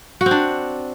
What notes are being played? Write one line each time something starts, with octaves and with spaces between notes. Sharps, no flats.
F#4
C4
D4